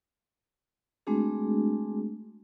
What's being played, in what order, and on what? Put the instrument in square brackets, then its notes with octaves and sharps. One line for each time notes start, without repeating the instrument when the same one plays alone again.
[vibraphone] G#3 A3 C4 D4 F#4 G#4